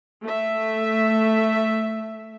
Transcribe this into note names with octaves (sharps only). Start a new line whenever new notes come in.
A3 E5